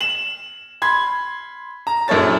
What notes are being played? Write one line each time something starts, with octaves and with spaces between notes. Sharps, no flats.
E7 F#7
B5 C6 G#6
A#5
A#1 F#2 E4 A4 C#5 A6